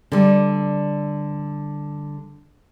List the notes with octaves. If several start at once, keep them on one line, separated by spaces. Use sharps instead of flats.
D3 G3